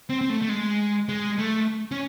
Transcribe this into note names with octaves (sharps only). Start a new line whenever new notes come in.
C4
C4
A3
A3
G#3
G#3
A3
C#4